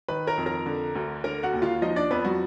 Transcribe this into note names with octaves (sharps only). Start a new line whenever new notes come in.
D#3 B4 B5
A#4 A#5
F2
A#4 A#5
D3
D2
D3 A#4 A#5
F#4 F#5
D#2
F4 F5
F3 D#4 D#5
D4 D5
F2 B3 B4
F#3 F#4